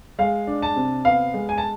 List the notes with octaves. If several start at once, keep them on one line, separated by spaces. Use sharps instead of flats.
G#3 F5
D4
A5
C3
B3 F5
G#3
G#5
A5